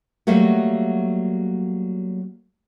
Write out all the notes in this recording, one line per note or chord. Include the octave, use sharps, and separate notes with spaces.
F#3 G3 A3 A#3 F#4